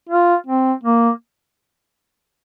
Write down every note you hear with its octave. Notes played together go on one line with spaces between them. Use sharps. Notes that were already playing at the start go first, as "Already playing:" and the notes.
F4
C4
A#3